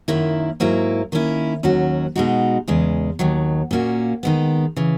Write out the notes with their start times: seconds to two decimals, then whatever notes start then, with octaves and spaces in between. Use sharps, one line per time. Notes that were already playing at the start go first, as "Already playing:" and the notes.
0.08 F#2 D#3 A#3 E4
0.60 G#2 F#3 A#3 E4
1.12 D#3 A#3 C#4 E4
1.63 D#2 D#3 F#3 C#4 F#4
2.16 B2 G#3 D#4 F#4
2.68 E2 C#3 G#3
3.19 D#2 D#3 F#3
3.71 A#2 A#3 C#4 F#4
4.23 D#3 G#3 B3
4.76 C#3 E3